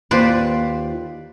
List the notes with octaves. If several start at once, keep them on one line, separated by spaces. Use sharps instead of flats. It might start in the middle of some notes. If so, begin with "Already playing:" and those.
D#2 F4 B4 C5 D5